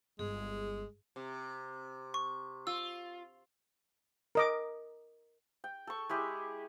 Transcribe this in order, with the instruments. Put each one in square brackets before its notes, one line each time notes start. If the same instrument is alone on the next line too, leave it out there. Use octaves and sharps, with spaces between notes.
[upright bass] G1 [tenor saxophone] G#3 [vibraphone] G#4
[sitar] C3
[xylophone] C#6
[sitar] F4 [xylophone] E6
[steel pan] A#4 D#5 D6
[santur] G5
A4 C#6
G#3 E4 G4 G#4